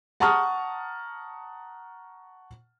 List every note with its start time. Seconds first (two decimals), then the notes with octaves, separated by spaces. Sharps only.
0.20 F#5 A5 A#5 C#6 D#6 F6